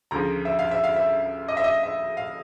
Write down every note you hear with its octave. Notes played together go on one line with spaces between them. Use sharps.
D2 C#3 F3 A#5
E5
F5
E5
F5
E5
D#5
E5
D#5
E5
F5